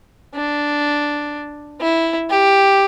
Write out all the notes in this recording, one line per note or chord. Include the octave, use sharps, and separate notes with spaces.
D4
E4
G4